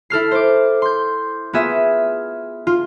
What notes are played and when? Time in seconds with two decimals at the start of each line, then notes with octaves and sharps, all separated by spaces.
0.10 E4 A4 F6 C7
0.31 C5 D6
0.82 C6 G6
1.53 B3 F4 G#4 E5
2.67 F4